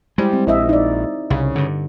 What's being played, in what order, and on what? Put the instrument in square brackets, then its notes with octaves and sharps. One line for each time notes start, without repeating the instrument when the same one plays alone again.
[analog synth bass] G3 [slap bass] G#3 [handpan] E4 G4 C5
[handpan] C4
[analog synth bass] A#1 [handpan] E4 D#5 E5
[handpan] D#4 D5
[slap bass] C2 [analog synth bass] C#3
[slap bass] G2 D3